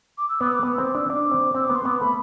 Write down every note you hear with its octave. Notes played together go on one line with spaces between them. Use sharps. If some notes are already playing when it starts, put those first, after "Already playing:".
D6
E6
B3 D6
E6
D6
B3
C4 E6
D6
D4 E6
D4 D6
C4
C4 E6
B3 D6
C6
B3 D6
A3 B5